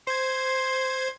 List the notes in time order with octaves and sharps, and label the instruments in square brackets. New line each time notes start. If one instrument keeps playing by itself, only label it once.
[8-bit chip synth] C5 G#6 [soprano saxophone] C6